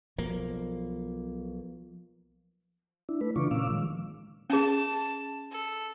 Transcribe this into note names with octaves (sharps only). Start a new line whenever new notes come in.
B1 B2 F3 A#3
D4 E4
A3 B4
C#3 E3 D4 F4 C#6 D6
A#2 A#3 C#4 F5 D6 E6
D#3 F3 G#3
C#4 G#4 A5
A4